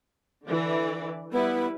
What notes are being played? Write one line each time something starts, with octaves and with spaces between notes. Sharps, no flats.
D3 E3 D5
G3 B3 E4 B4